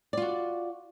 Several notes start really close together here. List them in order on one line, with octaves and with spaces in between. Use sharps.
D5 F4 F#4